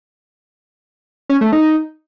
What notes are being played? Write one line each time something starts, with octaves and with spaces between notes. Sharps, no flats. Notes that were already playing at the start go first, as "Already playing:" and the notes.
C#4
A3
D#4